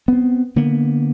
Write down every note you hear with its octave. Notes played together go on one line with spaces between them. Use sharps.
B3 C4
D3 A#3 B3